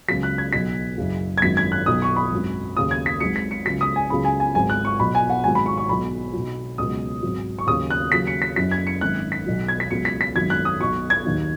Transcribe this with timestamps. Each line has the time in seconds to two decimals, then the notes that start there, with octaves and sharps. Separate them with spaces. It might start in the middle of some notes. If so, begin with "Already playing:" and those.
0.08 C#2 C#3 F#3 B6
0.23 F#6
0.38 G#6
0.53 B1 B2 F#3 B6
0.98 F#1 F#2 C#3 F#3
1.38 G#6
1.42 G#1 F#2 D#3 F#3 B6
1.57 G#6
1.72 F#6
1.86 B1 B2 F#3 D#6
2.02 C#6
2.16 B5
2.32 G#1 F#2 F#3
2.76 D#2 C#3 F#3 D#6
2.91 G#6
3.06 B6
3.20 G#1 G#2 F#3 C#7
3.36 B6
3.51 C#7
3.66 C#2 C#3 F#3 B6
3.81 D#6
3.96 G#5
4.10 C#2 C#3 F#3 B5
4.25 G#5
4.40 G#5
4.55 G#1 G#2 F#3 G#5
4.70 F#6
4.85 C#6
4.99 B1 B2 F#3 B5
5.15 G#5
5.30 F#5
5.44 G#1 G#2 D#3 F#3 G#5
5.55 B5
5.66 C#6
5.77 C#6
5.89 B1 B2 F#3 B5
6.33 B1 B2 F#3
6.78 C#2 B2 F#3 D#6
7.23 G#1 G#2 F#3
7.59 C#6
7.67 D#2 C#3 F#3 D#6
7.90 F#6
8.12 D#2 C#3 F#3 B6
8.27 C#7
8.42 B6
8.56 F#1 F#2 F#3 B6
8.71 G#6
8.87 C#7
9.01 G#1 F#2 D#3 F#6
9.32 B6
9.46 B1 B2 F#3
9.68 G#6
9.80 B6
9.90 C#2 B2 F#3 C#7
10.05 B6
10.21 B6
10.35 G#1 F#2 D#3 F#3 G#6
10.50 F#6
10.65 D#6
10.80 B1 B2 F#3 C#6
11.10 G#6
11.25 D#2 D#3 F#3